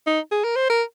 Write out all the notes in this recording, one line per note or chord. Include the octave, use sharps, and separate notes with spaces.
D#4
G#4
A#4
C5
A#4